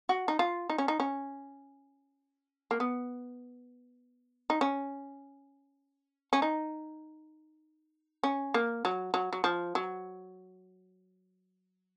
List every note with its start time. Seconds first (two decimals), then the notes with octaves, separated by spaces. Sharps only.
0.09 F#4
0.28 D#4
0.39 F4
0.70 D#4
0.78 C#4
0.88 D#4
1.00 C#4
2.71 A#3
2.80 B3
4.50 D#4
4.61 C#4
6.33 C#4
6.42 D#4
8.23 C#4
8.54 A#3
8.85 F#3
9.14 F#3
9.33 F#3
9.44 F3
9.75 F#3